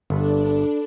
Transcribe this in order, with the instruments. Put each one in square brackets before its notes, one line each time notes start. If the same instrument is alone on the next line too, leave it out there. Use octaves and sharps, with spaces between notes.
[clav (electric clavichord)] G1 [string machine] D4 [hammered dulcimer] A4 B4